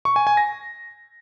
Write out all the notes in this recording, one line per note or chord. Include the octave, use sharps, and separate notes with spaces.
C#6
G#5
G#5
A#6